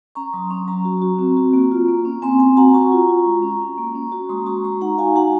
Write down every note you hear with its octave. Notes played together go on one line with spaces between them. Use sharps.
C#4 A#5 C#6
F#3 C6 D#6
C#4 A#5 C#6
F#3 A#5 C#6
F#4
F#4
C4
F#4
A#3
F4
A#3
C#4
C4 G#5 C6
C4 G#5 C6
F#4 F#5 A#5
F#4 A#5 C#6
F4
F4
G#3
C#4
C#4
A#3
C#4
F#4
G#3 C6 D#6
F#4 A#5 C#6
G#3 A#5 C#6
D#4 F#5 A#5
F#4 F5 G#5
F#4 F#5 A#5